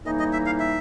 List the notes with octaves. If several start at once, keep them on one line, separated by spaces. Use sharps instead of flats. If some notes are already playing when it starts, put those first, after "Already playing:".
A2 E3 G3 A#3 D#4 D#5
D#5
E5
F5
E5